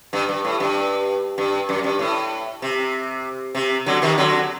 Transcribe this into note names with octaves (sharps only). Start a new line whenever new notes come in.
G2
G2
A2
G2
G2
F#2
G2
A2
C3
C3
D3 F#3
C3 D#3
D3 F#3